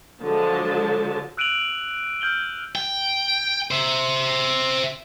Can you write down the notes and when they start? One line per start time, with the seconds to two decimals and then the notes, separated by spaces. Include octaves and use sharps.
0.22 D3 F3 F#3 G#3 A5
1.37 E6 F#6 D7 D#7 F7 F#7
2.21 F6 G6 F#7 G7
2.75 G5
3.71 C5 E5